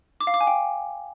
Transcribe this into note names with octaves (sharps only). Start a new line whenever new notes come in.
D6
F5
D6
G#5
G5